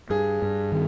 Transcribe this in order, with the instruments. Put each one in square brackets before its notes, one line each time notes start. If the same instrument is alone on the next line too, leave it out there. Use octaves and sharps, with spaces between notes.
[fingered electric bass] G2 [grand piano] G#4
[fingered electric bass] G2
D#3